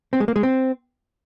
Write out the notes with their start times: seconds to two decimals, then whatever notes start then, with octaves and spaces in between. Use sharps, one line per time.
0.13 C4
0.20 G#3
0.28 A#3
0.36 G#3
0.43 C4